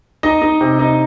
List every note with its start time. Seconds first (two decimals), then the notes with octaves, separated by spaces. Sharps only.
0.23 D#4 D#5
0.42 D#4
0.61 C3
0.79 D#4